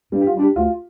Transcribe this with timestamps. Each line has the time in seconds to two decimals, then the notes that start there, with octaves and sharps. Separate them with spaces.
0.12 G2 G3
0.21 G4
0.27 F4
0.35 G3 D4
0.42 G4
0.56 D2 F4